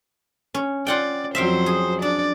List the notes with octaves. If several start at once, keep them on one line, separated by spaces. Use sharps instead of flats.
C#4
F4 D5 F#5 G5
F2 F#3 C5 E5 F5 G5
G#4
D4 D5